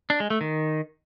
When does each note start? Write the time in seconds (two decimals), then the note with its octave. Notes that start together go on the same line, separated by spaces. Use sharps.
0.10 D4
0.20 G#3
0.30 A3
0.41 D#3